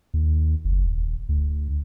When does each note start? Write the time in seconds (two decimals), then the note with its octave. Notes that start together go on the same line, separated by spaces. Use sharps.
0.14 D#2
0.65 F#1
0.87 D#1
1.29 D2